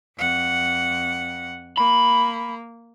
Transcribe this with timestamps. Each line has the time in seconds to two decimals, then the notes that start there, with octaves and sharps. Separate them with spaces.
0.17 F2 F#5
1.78 A#3 B5